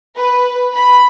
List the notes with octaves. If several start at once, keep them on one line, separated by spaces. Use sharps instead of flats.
B4
B5